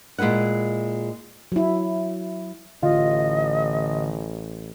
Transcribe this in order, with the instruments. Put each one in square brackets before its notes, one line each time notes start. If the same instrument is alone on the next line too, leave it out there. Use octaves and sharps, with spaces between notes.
[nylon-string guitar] A#2 G#3 E4 B4 F#5
[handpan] F#3 E4
[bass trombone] A1 [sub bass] D3 [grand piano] F4 [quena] D#5